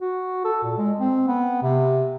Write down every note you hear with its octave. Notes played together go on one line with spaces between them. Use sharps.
F#4
A4
A#2
G#3
C4
B3
C3